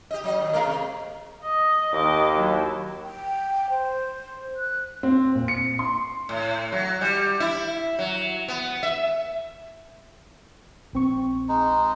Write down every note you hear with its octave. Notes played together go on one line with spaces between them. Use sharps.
G4 D#5
F#3 D#5
D#2
G#3 A3 A#4
C3
D#5
D#2 D#5 D6
F#3 E4
G5
C5
F#6
C4
A#2
C#7
C6
A2
F#3
G3
E4
F#3
B3
E5
A#1 C4 C#6
G#3 D#4